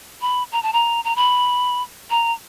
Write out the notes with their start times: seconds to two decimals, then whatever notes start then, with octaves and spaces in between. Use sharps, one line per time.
0.21 B5
0.52 A#5
0.63 A5
0.73 A#5
1.04 A#5
1.16 B5
2.10 A#5